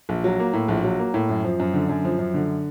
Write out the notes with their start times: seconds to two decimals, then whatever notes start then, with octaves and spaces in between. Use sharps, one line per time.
0.09 A#1
0.24 F#3
0.39 A#3
0.53 A2
0.68 A#1
0.84 F#3
0.99 A#3
1.14 A2
1.29 F#2
1.44 F3
1.60 F#2
1.74 D3
1.89 F#2
2.05 F3
2.19 F#2
2.34 D3